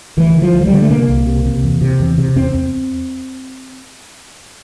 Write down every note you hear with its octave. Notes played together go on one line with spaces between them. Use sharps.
D2 E3
D3
F3
D2
F3
G3
D3
A3
C3 A#3
C2
C3
C3
E2
C3
E2
C3
E2 C4
E2